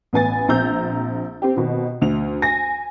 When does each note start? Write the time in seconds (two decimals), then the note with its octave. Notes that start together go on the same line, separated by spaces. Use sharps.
0.13 A1 B3 G#5 A6
0.48 A#1 C4 A#5 E6 G6
1.42 C4 G4
1.56 B2 D#3 C4
2.01 D2 F7
2.42 G#5 A#6